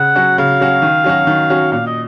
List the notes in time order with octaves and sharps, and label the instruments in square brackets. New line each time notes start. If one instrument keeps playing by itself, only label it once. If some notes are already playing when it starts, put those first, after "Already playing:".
Already playing: [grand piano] C#3 [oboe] F#5
[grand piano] F#3 C#4 F#4
[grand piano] C#3 [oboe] F5
[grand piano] F#3 C#4 F#4
D#3
F#3 C#4 F#4
D#3
F#3 C#4 F#4
[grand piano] A#2 [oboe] F5
[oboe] D#5